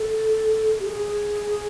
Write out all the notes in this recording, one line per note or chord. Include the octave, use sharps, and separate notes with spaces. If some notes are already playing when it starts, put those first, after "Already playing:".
Already playing: A4
G4
G#4